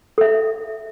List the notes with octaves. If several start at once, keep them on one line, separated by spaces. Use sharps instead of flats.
A4 E5